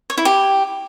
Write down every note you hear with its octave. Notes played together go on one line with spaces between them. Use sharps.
C#5
E4
G4